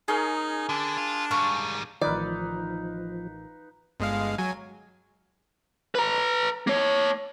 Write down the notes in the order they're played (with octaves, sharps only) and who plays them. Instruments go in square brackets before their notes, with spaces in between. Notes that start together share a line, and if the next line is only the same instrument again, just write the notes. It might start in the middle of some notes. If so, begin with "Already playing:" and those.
[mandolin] C#4 [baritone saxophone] D#4 [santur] G#4 A#4
[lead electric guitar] D3 [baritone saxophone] D4
[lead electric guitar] F4
[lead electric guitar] G#2 G3 [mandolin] F5 C#6
[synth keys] A1 D#3 [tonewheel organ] F3 [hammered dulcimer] D#4 B4 F5 [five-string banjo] D5
[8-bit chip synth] G1 G#3 F5
F#3 G#5
[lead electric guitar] B4 A#5
A#3 C#5